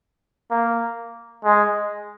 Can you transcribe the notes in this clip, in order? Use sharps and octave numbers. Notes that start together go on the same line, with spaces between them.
A#3
G#3